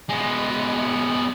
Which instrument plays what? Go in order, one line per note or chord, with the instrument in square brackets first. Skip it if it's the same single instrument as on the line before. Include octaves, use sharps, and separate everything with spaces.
[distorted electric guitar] G#3 B3